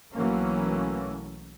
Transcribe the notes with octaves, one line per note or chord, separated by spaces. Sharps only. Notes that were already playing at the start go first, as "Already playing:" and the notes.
B1 E3 F#3 A3 A#3 C#4